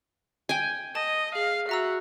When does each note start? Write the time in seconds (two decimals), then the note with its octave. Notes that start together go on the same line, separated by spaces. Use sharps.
0.49 G5 G#5
0.95 D#5 A5
1.35 G#4 F5
1.69 F#4 E5 A#5 E6